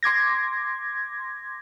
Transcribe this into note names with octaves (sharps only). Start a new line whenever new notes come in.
C6 D6 G#6 A#6